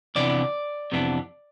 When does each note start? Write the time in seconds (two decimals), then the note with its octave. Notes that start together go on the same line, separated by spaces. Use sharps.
0.15 F2 C3 E3 B3 D4 D5
0.92 F2 C3 E3 B3 D4